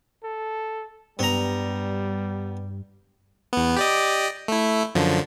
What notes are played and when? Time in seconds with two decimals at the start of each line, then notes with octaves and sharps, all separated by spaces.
0.24 A4
1.19 G2 G3 B3 A#5
3.53 E2 B3
3.76 G4 D5 D#5
4.48 A3 E4
4.95 F#2 D3 F3